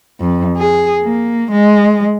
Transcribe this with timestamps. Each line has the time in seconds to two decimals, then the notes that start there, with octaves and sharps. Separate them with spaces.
0.20 F2
0.56 G#4
1.02 A#3
1.51 G#3